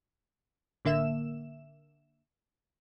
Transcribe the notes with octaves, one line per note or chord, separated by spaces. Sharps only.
A1 D3 A#3 E5 E7